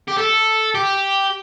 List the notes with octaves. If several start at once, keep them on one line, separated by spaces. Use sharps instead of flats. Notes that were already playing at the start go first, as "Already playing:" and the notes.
G4
A4
G4